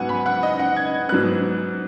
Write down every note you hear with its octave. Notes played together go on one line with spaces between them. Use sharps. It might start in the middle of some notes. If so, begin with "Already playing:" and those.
Already playing: G#2 F#3 B3 F#5 G#5
B5
F#5
D#5
F#5
G#6
G#2 F#3 B3 F#6